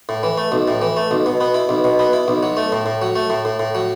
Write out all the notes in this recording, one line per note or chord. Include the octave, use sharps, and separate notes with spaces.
A2
E3
A3
B1
A2
E3
A3
B1
B2
B3
E4
B1
B2
B3
E4
B1
F#3
A3
A2
A2
F#3
A3
A2
A2
A2
F#3